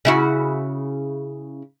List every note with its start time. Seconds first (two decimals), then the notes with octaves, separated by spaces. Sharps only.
0.05 C#3 E4 F#4